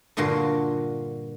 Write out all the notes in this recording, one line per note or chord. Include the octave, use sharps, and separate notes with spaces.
G2 A#2 D3 F4 F#4